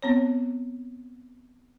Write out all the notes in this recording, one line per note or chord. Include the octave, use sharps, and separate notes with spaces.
B3 C4 C#5